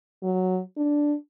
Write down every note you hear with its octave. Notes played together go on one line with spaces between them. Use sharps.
F#3
D4